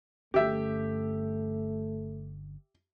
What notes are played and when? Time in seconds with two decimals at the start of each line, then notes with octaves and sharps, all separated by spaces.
0.34 G1 G2 A3 C#4 G4 E5